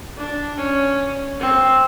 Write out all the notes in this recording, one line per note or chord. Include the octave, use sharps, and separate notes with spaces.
D4
C#4
C4